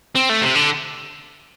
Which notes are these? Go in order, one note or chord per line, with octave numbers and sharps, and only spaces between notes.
C4
A3
C3
D3